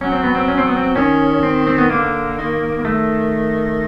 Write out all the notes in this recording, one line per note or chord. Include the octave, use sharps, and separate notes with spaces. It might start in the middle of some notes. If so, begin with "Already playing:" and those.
F#3 C#4
C4
B3
C4
C#4
C4
B3
C4
D#3 C#4
C4
C4
B3
D3 A#3
D#3
A#3
A3